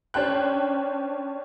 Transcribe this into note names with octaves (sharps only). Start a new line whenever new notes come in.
C#4 D4 C5 G5 F#6